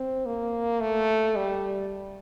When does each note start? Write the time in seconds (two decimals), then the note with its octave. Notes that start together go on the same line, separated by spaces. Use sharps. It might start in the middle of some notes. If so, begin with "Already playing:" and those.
Already playing: C4
0.26 A#3
0.81 A3
1.36 G3